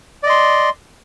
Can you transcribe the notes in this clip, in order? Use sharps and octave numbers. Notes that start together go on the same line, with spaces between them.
D5 D#5 C6